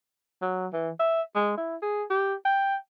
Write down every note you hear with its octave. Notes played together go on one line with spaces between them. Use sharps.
F#3
E3
E5
G#3
E4
G#4
G4
G5